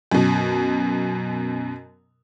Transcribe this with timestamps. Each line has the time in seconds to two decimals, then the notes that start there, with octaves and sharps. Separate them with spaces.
0.12 F#2 B2